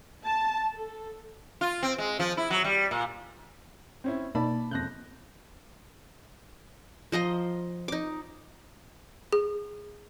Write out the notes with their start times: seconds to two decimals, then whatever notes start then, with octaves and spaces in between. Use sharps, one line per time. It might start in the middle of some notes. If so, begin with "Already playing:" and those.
0.25 A5
0.75 A4
1.61 F4
1.83 C4
1.98 G#3
2.19 F3
2.37 E4
2.50 F#3
2.64 G3
2.91 A#2
4.04 C4 C#4 E4
4.35 B2 A#3 D#4 D5 A5 B5
4.71 E1 F2 F#6 G6 A#6
7.12 F3 D#5 A#5 C6
7.88 D#4 D6
9.33 G#4